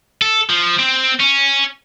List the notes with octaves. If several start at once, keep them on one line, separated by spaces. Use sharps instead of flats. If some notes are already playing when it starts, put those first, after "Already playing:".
A4
F3
C4
C#4